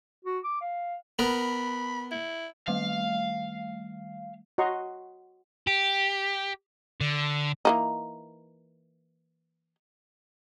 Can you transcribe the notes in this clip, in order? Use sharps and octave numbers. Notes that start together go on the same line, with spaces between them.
F#4
D6
F5
B3 A#4 B5
E4
D#3 G3 A3 F5
F#4 C#5 D#5 A#5 C6 C#6
G4
D3
E3 A#3 D#4